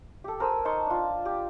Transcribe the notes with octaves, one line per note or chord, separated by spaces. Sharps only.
G4 A4
A#4 C5 G#5 E6
D#4 A5 C6 C#6
D4 F4
G4